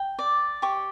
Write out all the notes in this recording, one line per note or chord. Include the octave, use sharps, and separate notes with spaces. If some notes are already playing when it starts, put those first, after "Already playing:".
Already playing: G5
D5
G4 C#6